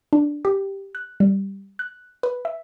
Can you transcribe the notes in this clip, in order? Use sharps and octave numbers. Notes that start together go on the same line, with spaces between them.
D4
G4
F#6
G3
F#6
B4
E5